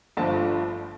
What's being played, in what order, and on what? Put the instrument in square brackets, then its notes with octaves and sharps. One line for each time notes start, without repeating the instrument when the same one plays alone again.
[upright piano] G1 G2 D3 F3 A3 A5